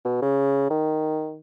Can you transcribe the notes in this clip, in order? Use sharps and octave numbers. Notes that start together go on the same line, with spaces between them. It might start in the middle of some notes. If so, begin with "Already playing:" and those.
B2
C#3
D#3